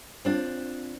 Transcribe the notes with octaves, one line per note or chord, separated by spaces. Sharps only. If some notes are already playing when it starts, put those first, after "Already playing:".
C4 D4 F4